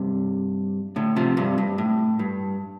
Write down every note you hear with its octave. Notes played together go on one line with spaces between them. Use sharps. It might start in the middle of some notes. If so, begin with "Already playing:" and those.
Already playing: G2 C3
A2 D3
C3 F3
G2 C3
G2
A2
G2